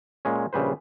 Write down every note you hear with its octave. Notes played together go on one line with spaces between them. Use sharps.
A#2 G#3 C#4
A#1 C#3 G3 B4 C5